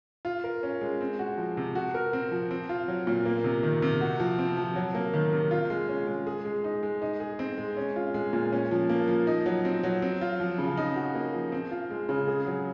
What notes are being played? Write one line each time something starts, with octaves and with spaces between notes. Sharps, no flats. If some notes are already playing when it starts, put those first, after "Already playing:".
F4
A#4
C#4
G#3
C4
F#4
F3
C3
F#4
A#4
C4
F3
C4
F4
F#3
A#2
A#3
C3
D#3
C3
F#4
F3
C4
F3
F#3
A#3
D#3
C3
F4
G#3
C#4
G#3
G#4
G#3
D#4
G#3
D#4
G#4
C4
G#3
C#4
F4
G#3
A#2
C#4
F3
A#3
F3
D#4
F#3
C4
F#3
C4
F4
F3
C#3
D#4
F#4
A#3
F3
C4
F4
G#3
C#3
G#4
F#3